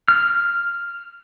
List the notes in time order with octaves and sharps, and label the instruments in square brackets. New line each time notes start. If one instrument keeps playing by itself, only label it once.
[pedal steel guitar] F6